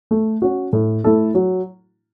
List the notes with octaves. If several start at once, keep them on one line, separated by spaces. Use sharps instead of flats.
A3
C#4 F#4
A2
A3 E4 A4
F#3